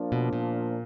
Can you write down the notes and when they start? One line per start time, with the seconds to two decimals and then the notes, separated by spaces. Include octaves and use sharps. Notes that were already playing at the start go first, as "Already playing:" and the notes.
Already playing: F3 A#3 D4
0.12 B2
0.33 A#2